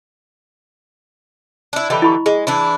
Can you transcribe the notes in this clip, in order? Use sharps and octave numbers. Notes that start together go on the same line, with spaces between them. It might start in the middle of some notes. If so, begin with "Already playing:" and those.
D4 E4
D3 E3 G4 D#5 B5
E4 B5 C#6
G#3 G#4
E3 D4 E4